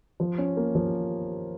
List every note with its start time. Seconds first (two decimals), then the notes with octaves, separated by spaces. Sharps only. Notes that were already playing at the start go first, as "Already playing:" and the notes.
0.20 F3
0.38 C#4
0.57 A#3
0.75 F3